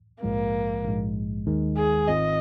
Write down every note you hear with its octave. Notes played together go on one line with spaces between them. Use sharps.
A#1 G#2 F3 G#3 A#3
A#1 G#2 G#3
D#2 D#3 G#3 D#4
G#4
G#1 G#2 D#3 C4 F4 D#5